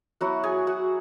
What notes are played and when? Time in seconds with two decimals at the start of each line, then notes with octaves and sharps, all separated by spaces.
0.21 F#3 B3 E4 F#4 F#5
0.44 G#4 G#5
0.67 F#4 F#5